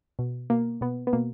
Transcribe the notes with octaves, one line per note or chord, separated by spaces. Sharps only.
B2
B2 A#3
B2 B3
B3
B2 A#3